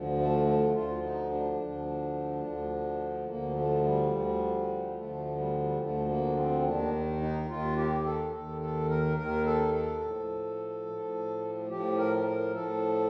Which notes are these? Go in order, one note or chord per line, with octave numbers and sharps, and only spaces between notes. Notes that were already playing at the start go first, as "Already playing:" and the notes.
Already playing: D2 D3 F3
A3
A3
D2 D3 F3 F4
D#4
D4
D2 D3 F3
D2 D3 F3
D2 D3 F3 A#3
A3
G3
D2 D3 F3
D2 D3 F3 A3
G3
G3
D2 D3 F3 A3
A#3
C4
D#2 D#3 D4
D#4
D#2 D#3 F4
G4
A4
D#2 D#3 A4
A4
A#4
D#2 D#3 A#4
A4
A4
A2 F3
A2 F3
A2 F3 G4
A#4
A#4
A2 F3 A4